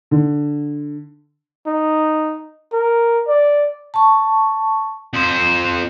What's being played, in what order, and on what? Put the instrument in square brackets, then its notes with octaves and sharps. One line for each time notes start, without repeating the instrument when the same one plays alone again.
[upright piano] D3
[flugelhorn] D#4
A#4
D5
[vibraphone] A5 C#6
[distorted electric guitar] F2 C5